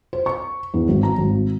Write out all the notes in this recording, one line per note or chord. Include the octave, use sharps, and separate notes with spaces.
C5
C#6
E2
G#1
A#5
G#1